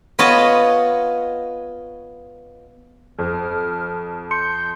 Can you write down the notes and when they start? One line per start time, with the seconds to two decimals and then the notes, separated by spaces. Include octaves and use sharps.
0.19 B3 F4 C#5 D#5 A5
3.19 F2 F6
4.31 C6 G6 C#7